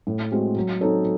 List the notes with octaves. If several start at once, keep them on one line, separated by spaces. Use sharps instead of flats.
A2
G#3 C4 F#4
F#3
C4 D#4 A4 C#5